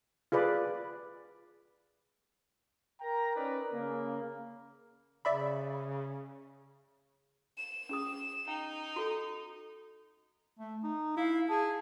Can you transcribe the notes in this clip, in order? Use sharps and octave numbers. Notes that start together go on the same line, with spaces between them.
F4 G#4 B4 D5
A#4 G5 A#5
C#4 D#4 A#4 B4 D5
C#3 A#3
C#3 D5 E5 B5
E7
C#4 G#4 D#6
D#4 G5
F#4 A4
A3
D#4
E4 F5
G#4 A5